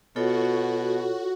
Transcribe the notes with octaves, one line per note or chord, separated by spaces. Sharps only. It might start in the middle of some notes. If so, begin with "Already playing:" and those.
B2 F4 F#4 A4 C#5